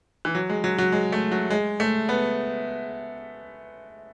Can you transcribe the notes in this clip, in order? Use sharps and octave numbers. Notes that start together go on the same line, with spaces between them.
E3
F#3
G#3
F#3
F#3
G#3
A3
F#3
G#3
A3
B3